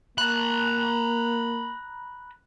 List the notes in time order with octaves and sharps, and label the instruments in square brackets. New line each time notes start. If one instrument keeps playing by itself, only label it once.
[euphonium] A#3 [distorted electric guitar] A#5 B5 [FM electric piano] F#6